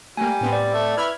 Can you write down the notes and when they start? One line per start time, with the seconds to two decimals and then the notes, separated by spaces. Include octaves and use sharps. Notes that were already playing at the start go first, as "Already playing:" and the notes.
0.17 G3 A3 A#3 G#5
0.41 A2 B3 C4
0.53 D5
0.74 A3 E5
0.97 E4 B4 B5 F6 G#6